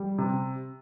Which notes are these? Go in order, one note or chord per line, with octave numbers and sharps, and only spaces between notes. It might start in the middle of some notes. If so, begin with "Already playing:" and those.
Already playing: G3
C3